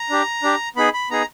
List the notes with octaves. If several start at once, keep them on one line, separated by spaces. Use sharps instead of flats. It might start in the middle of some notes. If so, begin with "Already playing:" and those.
Already playing: A#5
D4 G4
D4 G4
B3 D#4 G#4 B5
B5
B3 D#4 G#4 A#5